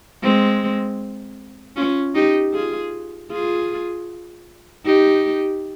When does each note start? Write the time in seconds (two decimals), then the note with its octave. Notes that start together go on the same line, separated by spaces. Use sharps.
0.23 G#3 C4
1.76 C#4 F4
2.15 D#4 G4
2.54 F4 G#4
3.31 F4 G#4
4.85 D#4 G4